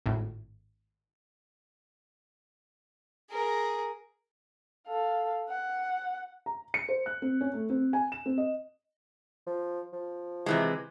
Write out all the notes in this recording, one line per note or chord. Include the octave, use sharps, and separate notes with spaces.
G#1 A2
G#4 A#4
A4 F5
F#5
A#5
C#7
C5
F#6
C4
C#4
A3
C4
G#5
E7
C4
D#5
F3
F3
C3 E3 G#3